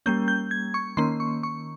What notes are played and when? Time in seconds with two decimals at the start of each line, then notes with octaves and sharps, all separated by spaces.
0.06 G3 A#3 C#4 G6
0.28 G6
0.51 G#6
0.74 C#6
0.97 D#3 A#3 C#4 C6
1.20 C#6
1.43 C#6